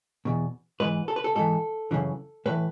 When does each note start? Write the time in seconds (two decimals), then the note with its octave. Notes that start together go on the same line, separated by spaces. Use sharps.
0.25 E2 B2
0.80 G#2 E3 B4
1.08 A4
1.16 B4
1.24 A4
1.35 G#2 E3 A4
1.91 F#2 C#3 E3
2.46 A2 E3 B4